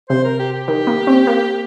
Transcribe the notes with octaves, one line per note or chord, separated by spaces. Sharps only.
C3 C5
A#4
G4
G4
D#3
A#3
C4
A#3